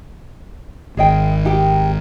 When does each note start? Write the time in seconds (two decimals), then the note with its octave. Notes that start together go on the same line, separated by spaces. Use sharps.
0.97 G#1 G#4 D#5 G5
1.44 D#4 G4 G5